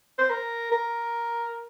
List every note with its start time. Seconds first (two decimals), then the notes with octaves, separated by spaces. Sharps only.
0.19 C5
0.30 A#4
0.72 A#4